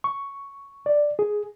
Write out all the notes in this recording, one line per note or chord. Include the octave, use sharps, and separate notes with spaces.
C#6
D5
G#4